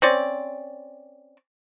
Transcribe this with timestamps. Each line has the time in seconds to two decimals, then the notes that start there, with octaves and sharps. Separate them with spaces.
0.02 C4 C#4 D5